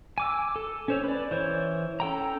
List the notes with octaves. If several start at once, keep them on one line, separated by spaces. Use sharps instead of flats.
G#5 D6 E6
A4
C#4 C5 C#5
B4 D5
E3 C5 C#5
C#4 A4 G5 A#5